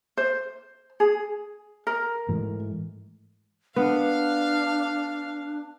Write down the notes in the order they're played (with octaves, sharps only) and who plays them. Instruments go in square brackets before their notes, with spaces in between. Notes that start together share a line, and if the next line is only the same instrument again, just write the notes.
[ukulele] C5
G#4
A#4
[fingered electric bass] G#2 E3 A3
[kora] B3 [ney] D4 [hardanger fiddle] F5